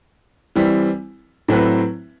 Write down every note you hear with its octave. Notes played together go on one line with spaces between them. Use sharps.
E3 G3 C4 E4
A2 F#3 C4 E4 B4